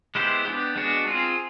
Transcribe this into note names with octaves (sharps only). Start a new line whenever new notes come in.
G#3 B3 E4 G4 C5
B3 D4 G4
G#3 B3 D4 F#4
C4 F4 G#4